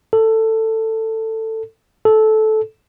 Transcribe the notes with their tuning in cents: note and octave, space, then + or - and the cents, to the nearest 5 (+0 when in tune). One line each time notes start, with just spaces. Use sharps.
A4 +15
A4 -15